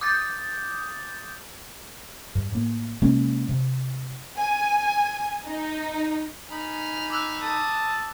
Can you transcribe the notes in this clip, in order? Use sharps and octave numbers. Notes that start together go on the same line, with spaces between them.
D6 D#6 G6 A6
G2
A2 A#3
C3 G#3 A#3 C#4
C3
G#5
D#4
D#4 G#5 B5 F6
D6 E6 F#6
A5 D#6